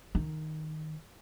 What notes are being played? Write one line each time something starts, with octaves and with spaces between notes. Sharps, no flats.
D#3